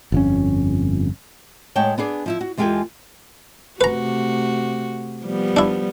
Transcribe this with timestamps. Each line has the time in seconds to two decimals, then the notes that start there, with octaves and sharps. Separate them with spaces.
0.12 G1 F2 C#4
1.76 A2 G#3 C#5 F#5 G5 A5
1.98 B3 D4 G#4 D5
2.26 F3 E4 E5
2.41 F#4
2.57 E2 G#3 F4 G4 A4 G#5
3.81 C3 A3 F#4 B4 A#5
5.22 F3 G3 B3
5.56 D4 E4